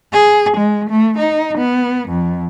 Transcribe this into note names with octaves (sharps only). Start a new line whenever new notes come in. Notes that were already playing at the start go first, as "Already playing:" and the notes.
G#4
G#3
A3
D#4
B3
F2